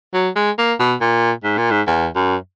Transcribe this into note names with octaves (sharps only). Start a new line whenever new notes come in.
F#3
G#3
A#3
B2
A#2
G#2
A#2
G#2
E2
F#2